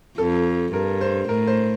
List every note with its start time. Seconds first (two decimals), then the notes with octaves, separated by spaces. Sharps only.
0.18 F2 A4
0.73 G2 A#4
1.01 C5
1.29 A2 A#4
1.47 C5